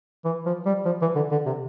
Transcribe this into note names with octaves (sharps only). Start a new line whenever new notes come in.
E3
F3
G3
F3
E3
D3
D3
C3